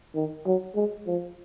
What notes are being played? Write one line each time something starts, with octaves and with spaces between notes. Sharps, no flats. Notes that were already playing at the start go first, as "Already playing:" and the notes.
D#3
F#3
G#3
F3